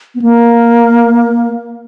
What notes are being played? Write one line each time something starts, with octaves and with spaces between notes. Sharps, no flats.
B3
A#3